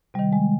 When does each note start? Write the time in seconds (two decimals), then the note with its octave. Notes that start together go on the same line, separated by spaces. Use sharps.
0.14 C3 G3
0.19 D#3
0.33 G#3